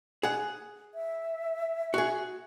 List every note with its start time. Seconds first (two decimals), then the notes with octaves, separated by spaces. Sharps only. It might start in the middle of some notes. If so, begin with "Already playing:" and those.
0.23 G#4 F#5
0.94 E5
1.94 F#4 G#4